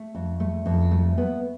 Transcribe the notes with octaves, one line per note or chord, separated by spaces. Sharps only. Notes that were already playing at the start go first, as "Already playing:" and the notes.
Already playing: A3
F2
A3
F2
A3
B3